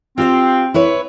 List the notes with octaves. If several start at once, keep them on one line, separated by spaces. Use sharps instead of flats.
C4 F4 G4 F5
E4 B4 C#5